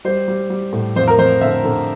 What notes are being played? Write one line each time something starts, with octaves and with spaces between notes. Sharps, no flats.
G3 C5
G3
G3
A2
F2 C5
A#4
F2 C5
D3 E5
D3